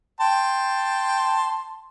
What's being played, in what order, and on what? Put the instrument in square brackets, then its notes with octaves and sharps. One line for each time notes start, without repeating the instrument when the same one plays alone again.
[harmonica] G5 A5 C6